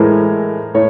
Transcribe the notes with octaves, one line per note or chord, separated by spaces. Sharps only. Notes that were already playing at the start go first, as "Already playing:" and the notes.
Already playing: A2 E3 G#3 A#4 C5
A2 C#5